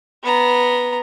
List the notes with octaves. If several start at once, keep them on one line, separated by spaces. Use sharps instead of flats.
B3 A#5